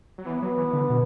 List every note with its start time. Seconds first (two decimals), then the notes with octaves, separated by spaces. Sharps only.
0.18 F#3
0.26 E3 B3
0.42 F#3
0.57 E3
0.73 D3
0.90 B2